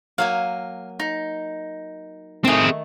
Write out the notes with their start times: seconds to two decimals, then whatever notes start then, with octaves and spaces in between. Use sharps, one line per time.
0.18 F#3 A#3 F5 G#5
1.00 D#4
2.45 D#3 A3 C4 G#4